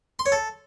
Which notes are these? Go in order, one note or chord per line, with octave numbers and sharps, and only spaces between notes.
C6
C#5
A4